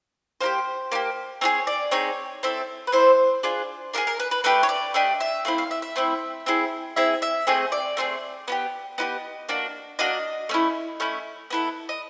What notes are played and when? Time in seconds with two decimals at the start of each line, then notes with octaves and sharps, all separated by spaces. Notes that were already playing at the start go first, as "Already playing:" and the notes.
0.41 A#3 D#4 G4 C5
0.92 A#3 D#4 G4
1.41 C4 D#4 G#4 C#5
1.67 D5
1.91 C4 D#4 G#4 C#5
2.43 C4 E4 A4
2.87 B4
2.92 C4 E4 A4 C5
3.43 D4 F4 G#4
3.93 D4 F4 G#4 A#4
4.07 A#4
4.20 B4
4.31 B4
4.44 A3 D4 G4 B4
4.63 C#5
4.69 D5
4.94 A3 D4 G4 D#5
5.20 E5
5.45 A3 C4 E4 F5
5.58 F5
5.71 E5
5.82 E5
5.96 A3 C4 E4
6.46 C4 E4 G#4
6.96 C4 E4 G#4 E5
7.22 E5
7.47 A3 C4 G#4 D#5
7.72 D5
7.97 A3 C4 D#4 G#4
8.48 B3 E4 G4
8.98 B3 E4 G4 D#5
9.49 A#3 D4 F#4
9.99 A#3 D4 F#4 D#5
10.49 A3 C#4 E4
11.00 A3 C#4 E4
11.50 B3 E4 A4
11.89 D#5